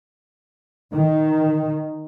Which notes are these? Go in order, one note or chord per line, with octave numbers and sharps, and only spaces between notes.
D#3